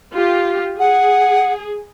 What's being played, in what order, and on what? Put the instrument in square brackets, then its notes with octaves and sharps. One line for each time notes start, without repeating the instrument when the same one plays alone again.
[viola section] F4 G4
[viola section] G#4 [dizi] F#5